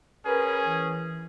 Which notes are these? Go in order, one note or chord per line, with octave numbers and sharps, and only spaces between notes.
C#4 G#4 A#4 B4
E3